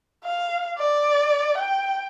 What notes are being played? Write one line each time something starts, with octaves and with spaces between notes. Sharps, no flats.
F5
D5
G5